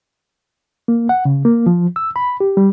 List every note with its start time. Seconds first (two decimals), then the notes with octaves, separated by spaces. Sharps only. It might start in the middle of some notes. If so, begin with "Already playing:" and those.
0.88 A#3
1.09 F#5
1.25 C#3
1.45 A#3
1.67 F3
1.96 E6
2.16 B5
2.40 G4
2.57 G3